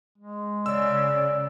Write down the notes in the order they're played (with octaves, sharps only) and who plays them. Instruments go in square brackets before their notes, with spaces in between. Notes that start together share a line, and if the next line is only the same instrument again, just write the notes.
[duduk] G#3
[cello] C#3 [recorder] D5 [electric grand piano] E6